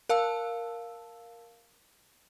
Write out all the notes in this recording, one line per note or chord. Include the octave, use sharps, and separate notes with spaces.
A#4 F5 A5 E6